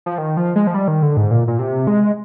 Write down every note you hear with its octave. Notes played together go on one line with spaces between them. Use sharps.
F3
D#3
F3
G#3
F3
G3
D#3
D3
G#2
A#2
A#2
C3
G#3